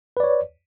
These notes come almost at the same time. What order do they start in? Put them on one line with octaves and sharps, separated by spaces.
B4 D5 C#5